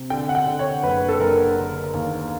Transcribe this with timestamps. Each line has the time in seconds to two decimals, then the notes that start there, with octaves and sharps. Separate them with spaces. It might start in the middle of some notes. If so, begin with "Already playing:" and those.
Already playing: C3
0.10 D3 G5
0.29 F#5
0.35 G5
0.47 D3
0.59 C#5
0.83 F#1 B4
1.09 A4
1.20 F#1 A#4
1.57 D3
1.94 D#2